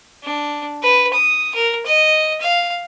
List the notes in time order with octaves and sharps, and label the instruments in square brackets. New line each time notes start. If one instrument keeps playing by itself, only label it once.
[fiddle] D4
B4
D#6
A#4
D#5
F5